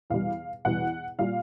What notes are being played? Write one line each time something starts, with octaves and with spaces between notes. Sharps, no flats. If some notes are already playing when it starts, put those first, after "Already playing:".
E2 B2 G3 F5
E2 B2 G3 F#5
A#2 G3 F5